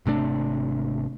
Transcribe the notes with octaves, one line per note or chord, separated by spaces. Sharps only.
G#1 C3 A3 D4